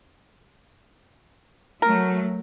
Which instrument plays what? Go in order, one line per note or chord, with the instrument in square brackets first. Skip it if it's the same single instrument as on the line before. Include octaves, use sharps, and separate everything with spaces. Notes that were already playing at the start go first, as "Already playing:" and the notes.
[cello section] F#3 A3 [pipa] A#4